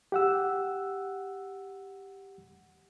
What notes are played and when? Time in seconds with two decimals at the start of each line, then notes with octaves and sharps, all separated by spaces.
0.12 G4 F#5 E6